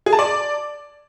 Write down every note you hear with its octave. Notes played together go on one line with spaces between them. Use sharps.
G#4
A5
D5